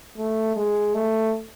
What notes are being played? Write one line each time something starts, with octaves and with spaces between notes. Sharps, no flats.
A3
G#3
A3